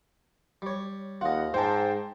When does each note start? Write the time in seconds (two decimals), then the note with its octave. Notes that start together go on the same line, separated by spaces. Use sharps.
0.62 G3 C#5
1.21 D#2 F4 D#5 F#5
1.54 G#2 G#3 C5 G5 A5